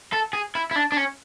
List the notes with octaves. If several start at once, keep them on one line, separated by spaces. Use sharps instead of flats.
A4
G#4
E4
E4
D4
D4
C#4